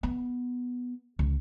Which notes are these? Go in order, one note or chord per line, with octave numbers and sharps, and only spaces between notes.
B3
C#2